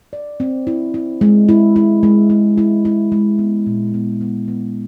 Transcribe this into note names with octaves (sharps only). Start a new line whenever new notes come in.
D5
C4
E4
E4
G#3
E4
E4
G#3
E4
E4
E4
G#3
B3
A#2
B3
B3
B3